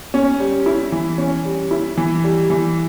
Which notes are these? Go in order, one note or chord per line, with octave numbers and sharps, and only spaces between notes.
C#4
G3
E4
E3
C#4
G3
E4
E3
G3
E3